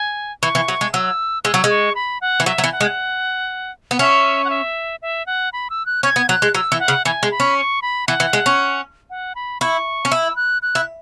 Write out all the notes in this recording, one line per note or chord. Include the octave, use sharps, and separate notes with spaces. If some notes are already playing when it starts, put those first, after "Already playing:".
Already playing: G#5
E3 C#6
E3
F#3
G#3
F#3 E6
G#3 E6
F#3
G#3
C#6
B5
F#5
E3
F#3 E5
F#3
E3
F#5
G#3
B3
C#4 E5
F#5
E5
E5
F#5
B5
E6
F#6
C#4 G#6
B3
F#3 F#6
G#3
F#3 E6
E3
F#5
C#3
E3 G#5
G#3
B5
C#4
C#6
B5
E3 F#5
E3
G#3
C#4
F#5
B5
E4 C#6
C#4
E4 E6
F#6
F#6
E4